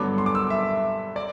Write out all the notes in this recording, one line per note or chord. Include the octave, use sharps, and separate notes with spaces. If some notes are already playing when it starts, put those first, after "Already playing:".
Already playing: G2 D3 F#3 B3 D6
C6
D6
E6
E5
D5